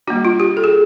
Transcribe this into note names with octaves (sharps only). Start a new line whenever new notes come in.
G3 A#3 D4 F#4
F4
G4
A4
G#4